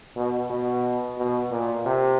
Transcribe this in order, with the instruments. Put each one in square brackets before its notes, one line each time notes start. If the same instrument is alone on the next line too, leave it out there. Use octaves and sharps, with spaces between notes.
[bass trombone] B2
B2
B2
A#2
C3